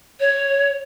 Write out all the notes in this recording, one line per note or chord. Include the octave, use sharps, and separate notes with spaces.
C#5